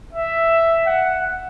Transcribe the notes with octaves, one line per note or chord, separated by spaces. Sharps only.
E5
F#5